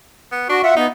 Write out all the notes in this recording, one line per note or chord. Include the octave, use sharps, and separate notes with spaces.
B3
D4 F#4
F4 E5 F#5
B3 D#4